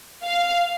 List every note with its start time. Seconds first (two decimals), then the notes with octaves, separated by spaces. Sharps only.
0.25 F5